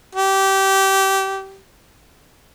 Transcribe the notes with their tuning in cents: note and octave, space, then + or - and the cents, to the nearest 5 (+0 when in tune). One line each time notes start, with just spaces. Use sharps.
G4 -20